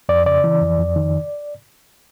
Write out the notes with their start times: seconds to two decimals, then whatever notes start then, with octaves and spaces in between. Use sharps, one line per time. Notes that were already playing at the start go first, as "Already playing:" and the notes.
0.09 F2 D5
0.26 C#3 D5
0.44 E3
0.62 F2
0.79 F2
0.96 D#3